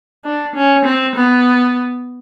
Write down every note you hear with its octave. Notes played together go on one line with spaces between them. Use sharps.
D4
C#4
C4
B3